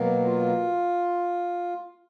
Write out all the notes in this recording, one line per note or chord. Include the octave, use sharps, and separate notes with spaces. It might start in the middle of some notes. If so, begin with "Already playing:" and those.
Already playing: B2 F#3 A#3
F4